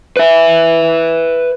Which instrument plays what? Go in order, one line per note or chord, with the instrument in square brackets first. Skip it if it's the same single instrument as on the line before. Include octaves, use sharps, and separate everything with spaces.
[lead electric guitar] B4 E5